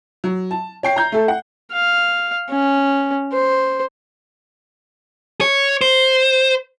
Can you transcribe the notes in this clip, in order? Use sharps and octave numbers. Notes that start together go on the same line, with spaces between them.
F#3
A5
C#5 G5 C7
A#5 G6
A3 A4
F#5
F5
C#4
C5
C#5
C5